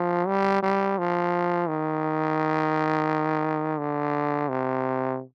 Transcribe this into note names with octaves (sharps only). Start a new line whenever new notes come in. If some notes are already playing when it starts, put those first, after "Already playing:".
Already playing: F3
G3
G3
F3
D#3
D3
C3